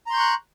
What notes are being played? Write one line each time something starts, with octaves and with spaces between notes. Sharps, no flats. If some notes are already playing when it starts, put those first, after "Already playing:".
A#5 C6 C#6 F#6 G6